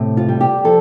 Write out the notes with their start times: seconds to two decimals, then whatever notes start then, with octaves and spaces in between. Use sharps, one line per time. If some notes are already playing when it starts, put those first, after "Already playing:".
Already playing: A2 C3
0.17 F4
0.28 G3
0.41 G4
0.64 F3 A4